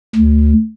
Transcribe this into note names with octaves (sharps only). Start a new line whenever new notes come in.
D2